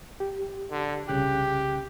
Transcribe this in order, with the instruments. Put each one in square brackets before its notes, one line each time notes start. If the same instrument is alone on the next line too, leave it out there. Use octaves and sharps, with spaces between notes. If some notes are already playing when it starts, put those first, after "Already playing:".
[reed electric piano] G4
[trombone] D3
[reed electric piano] C2 C#3 F#6 [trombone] G4